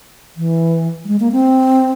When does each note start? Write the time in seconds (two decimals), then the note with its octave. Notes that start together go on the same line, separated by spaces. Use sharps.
0.37 E3
1.05 G3
1.08 G#3
1.20 A#3
1.32 C4